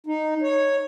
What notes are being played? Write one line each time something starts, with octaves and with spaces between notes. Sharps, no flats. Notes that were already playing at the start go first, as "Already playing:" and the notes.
D#4
C#5